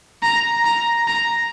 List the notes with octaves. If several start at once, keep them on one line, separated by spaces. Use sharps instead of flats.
A#5
A#5
A#5